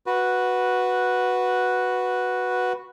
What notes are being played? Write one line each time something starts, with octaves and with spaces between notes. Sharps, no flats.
F#4 B4